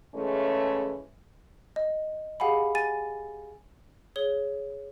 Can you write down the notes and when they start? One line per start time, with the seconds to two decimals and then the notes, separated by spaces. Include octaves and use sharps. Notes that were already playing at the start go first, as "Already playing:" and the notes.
0.15 C#3 E3 G#3 A3 C#4
1.76 D#5
2.40 G4 G#4 F5 F#5 G#5 B5
2.75 G#5 A6 D#7
4.16 G#4 C#5 G7